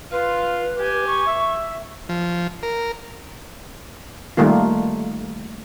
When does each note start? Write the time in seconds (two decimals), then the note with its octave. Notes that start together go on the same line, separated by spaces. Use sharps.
0.12 F4 B4 F5
0.79 G4 G#5
1.07 C#6
1.26 E5
2.09 F3
2.63 A#4
4.37 D#3 G3 A3 A#3 F4